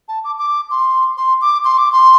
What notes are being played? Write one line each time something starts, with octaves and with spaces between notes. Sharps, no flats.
A5
D6
D6
C6
C6
D6
C6
D6
C6